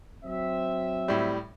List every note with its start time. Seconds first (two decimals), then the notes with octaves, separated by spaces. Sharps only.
0.24 F#3 C4 E5
1.08 A2 G3